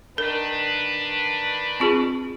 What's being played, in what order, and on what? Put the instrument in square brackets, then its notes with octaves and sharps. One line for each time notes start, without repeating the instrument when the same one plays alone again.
[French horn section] D#3 D4 B4 [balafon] A#4
[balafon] C4 F4 G#4